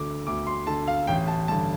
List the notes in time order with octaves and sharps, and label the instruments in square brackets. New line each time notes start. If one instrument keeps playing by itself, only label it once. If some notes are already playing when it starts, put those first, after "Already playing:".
Already playing: [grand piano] D2 D3 D6
D2 D6
C6
D3 A5
F5
A1 G5
A5
G2 D3 A5